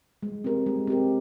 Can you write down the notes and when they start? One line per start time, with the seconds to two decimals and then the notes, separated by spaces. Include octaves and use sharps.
0.23 G#3
0.44 C4 G4 A#4
0.66 G#3
0.87 C4 G4 A#4